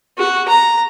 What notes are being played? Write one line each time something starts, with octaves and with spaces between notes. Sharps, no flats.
F#4
A#5